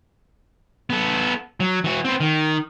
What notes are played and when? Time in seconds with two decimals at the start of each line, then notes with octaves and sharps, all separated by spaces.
0.90 B3 A4
1.60 F#3
1.84 E3 F#4
2.05 B3 C4
2.20 D#3